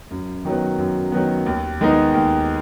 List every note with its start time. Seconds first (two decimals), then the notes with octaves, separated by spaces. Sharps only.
0.10 F#2
0.45 D#3 F#3 B3
0.78 F#2
1.12 D#3 F#3 B3
1.46 D#2
1.81 D#3 G#3 B3 D#4
2.14 D#2